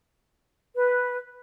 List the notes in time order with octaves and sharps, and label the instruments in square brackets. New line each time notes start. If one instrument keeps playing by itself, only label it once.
[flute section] B4